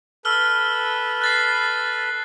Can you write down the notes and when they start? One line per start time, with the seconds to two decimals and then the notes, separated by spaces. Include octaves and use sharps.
0.25 A4 B4 E6 F6 G7
1.21 F#6 A6 C7